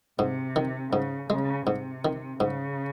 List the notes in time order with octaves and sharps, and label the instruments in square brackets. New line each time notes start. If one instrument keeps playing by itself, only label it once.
[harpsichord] G#2 [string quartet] C3
[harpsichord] D#3
[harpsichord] G#2 [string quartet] C#3
[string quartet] C#3 [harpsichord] G#3
[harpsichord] G#2 [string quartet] C3
[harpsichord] D#3
[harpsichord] G#2 [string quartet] C#3